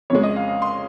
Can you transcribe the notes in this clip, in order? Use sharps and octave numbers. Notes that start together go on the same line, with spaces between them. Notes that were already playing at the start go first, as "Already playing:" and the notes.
F2 C#3 G#3 C#5
D#5
F5
F5
C6